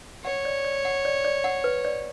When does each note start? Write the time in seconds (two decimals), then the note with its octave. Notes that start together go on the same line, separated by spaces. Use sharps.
0.24 C#5 F#5
0.45 D5
0.65 D5
0.85 F#5
1.05 D5
1.25 D5
1.44 F#5
1.64 B4
1.85 D5